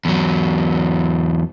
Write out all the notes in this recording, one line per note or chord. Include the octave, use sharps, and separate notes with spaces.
E2 F#3